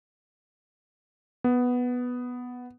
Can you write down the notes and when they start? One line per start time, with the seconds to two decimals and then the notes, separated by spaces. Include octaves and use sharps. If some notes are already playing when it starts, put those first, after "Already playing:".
1.44 B3